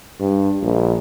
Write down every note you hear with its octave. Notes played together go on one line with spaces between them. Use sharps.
G2
A#1